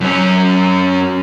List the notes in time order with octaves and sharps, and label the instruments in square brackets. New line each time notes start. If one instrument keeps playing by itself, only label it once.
[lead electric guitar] F#2 C#4